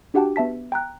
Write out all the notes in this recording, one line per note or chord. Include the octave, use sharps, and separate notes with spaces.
D4 F#4 G4 F#5 G5 A5
B3 E5 A5 B6
G5 A#5 F#6